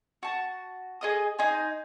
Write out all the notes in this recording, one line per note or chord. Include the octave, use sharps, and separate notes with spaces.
F#4 A5
G#4 D#5 D#6
D#4 D#5 G#5 C6